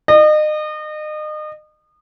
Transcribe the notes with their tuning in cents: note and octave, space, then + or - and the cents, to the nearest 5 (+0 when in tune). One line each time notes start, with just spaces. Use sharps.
D#5 -35